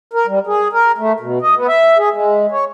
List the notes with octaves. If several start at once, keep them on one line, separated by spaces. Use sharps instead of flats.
A#4
G3
G#4
A#4
A3
B2
D#5
B3
E5
G#4
G#3
C#5